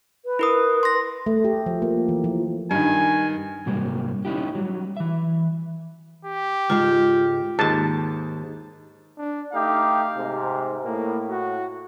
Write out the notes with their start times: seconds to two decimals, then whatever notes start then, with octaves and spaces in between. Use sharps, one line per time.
0.25 B4
0.39 E4 A#4 D#6
0.83 C6 A#6
1.26 A3
1.45 G4
1.66 F3
1.82 A#3
2.09 E3
2.24 F3
2.71 G2 D#3 G#5
3.66 G#2 C3 F#3 G3 A#3
4.25 C#4 D#4 E4 G4
4.55 F#3 G3
4.97 E3 E5
6.25 G4
6.70 C#2 G#2 G#3 F4
7.59 D#2 G#2 A5
9.18 D4
9.53 A3 D#4 G4 F5
10.16 G#2 C3
10.85 A2 A#3
11.30 F#4